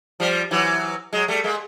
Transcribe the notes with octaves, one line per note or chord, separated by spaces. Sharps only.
F3 G3
E3 F#3
F#3 G#3
G3 A3
G#3 A#3